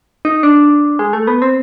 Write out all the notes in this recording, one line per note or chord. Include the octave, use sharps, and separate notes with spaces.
D#4
D4
G#3
A3
B3
C4